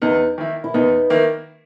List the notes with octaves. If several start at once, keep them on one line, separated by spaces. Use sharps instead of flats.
E2 B3 D#4
D#3 A#3 E4
E4
E2 B3 D#4
D#3 A#3 E4